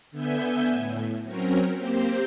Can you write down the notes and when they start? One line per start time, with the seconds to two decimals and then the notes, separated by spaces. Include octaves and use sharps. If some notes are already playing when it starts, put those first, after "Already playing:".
0.11 D3 B3 E5 G#5 G6
0.70 A2
1.23 F#3 C4 C#4 A#4
1.76 A#3 C4 G4 C5